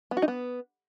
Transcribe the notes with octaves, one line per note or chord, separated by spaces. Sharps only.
B3
F#4
D#4
B3